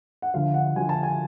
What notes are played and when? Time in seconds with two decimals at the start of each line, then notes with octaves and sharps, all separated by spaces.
0.22 F#5
0.34 D2 D3 F3 F5
0.54 F#5
0.75 D2 D3 F3 G#5
0.89 A5
1.03 G#5